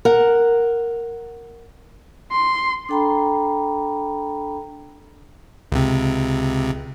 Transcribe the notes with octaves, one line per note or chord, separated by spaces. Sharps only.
A#4 F#5
C6
D4 A4 G5 A#5 B5
C#2 C3